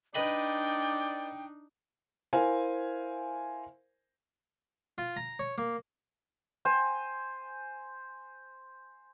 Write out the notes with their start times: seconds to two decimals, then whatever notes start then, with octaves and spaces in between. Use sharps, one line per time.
0.15 D4 D#4 B4 D5 D#5 G5 B5
2.33 E4 A#4 C5 F5 G#5
4.98 F4
5.16 A#5
5.39 C#5
5.58 A#3
6.65 C5 G#5